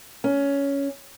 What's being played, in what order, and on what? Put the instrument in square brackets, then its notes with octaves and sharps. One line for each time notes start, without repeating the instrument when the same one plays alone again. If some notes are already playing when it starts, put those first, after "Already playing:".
[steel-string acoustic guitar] C#4